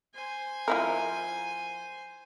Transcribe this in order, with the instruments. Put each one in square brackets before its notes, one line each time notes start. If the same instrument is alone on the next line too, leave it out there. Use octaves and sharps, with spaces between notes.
[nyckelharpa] C5 G#5
[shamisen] F3 E4 A#4